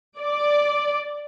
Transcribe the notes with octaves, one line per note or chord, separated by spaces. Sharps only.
D5